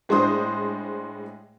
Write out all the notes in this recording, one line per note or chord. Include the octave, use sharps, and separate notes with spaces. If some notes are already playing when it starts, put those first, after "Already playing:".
A2 G#3 D4 C5 D#6